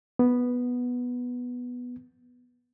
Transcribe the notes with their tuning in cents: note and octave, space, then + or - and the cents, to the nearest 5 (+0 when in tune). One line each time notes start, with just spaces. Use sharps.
B3 -5